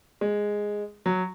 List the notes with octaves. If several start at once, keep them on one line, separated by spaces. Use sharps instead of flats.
G#3
F#3